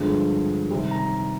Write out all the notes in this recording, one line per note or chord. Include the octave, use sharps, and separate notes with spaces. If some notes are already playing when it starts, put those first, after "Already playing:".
Already playing: G2 D3 F3 G#3
C3 D#3 G3
A#5